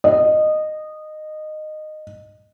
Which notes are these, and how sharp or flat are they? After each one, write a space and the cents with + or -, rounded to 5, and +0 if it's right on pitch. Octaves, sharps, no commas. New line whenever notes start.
D#5 -15